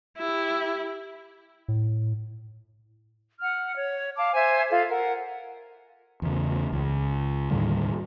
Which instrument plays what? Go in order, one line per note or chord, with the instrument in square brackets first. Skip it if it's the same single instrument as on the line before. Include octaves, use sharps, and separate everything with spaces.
[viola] E4 G4
[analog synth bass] A2
[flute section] F#5 F6
C#5
F5 A5 D6
C5 E5 G#5 G#6
F4 A4 F5
A#4 F#5
[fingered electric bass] E2 C#3
C#2
D#2 A2 D3 G3